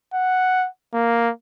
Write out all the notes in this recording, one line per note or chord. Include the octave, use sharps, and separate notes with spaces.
F#5
A#3